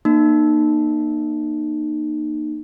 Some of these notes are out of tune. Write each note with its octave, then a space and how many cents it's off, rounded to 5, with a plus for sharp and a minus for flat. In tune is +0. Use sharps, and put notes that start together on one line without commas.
A#3 +10 D#4 -35